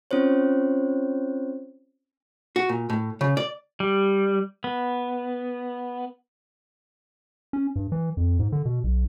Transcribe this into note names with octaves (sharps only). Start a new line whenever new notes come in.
C4 C#4 F4 C5 C#5
F#4
A#2
A2
C#3
D5
G3
B3
C#4
G2
E3
F2
G#2
D3
B2
B1